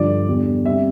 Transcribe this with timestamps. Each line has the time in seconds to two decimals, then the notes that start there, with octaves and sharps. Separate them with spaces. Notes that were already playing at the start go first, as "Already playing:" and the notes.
Already playing: G2 D3 F3 D5
0.28 E2 D3 G3
0.65 C3 G3 E5